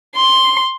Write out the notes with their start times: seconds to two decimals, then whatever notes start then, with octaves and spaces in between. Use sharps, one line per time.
0.15 C6